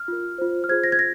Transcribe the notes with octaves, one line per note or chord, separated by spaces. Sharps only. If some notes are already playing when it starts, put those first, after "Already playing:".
Already playing: F6
F4 A#4
F4 C5
F6
F4 G#4 C5 G#6
A#6
G#6
A#6